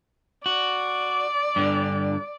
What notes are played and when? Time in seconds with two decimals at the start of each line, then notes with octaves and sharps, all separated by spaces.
0.46 F#4 D5
1.56 G2 D3